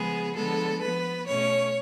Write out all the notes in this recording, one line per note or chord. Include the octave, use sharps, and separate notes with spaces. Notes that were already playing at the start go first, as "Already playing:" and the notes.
Already playing: C#3 F3 G#3 B3 G#4
D3 F3 G#3 B3 A4
F3 B3 B4
B2 A3 C#4 C#5